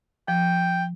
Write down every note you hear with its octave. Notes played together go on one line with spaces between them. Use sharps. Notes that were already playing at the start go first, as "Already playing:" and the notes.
F3 G5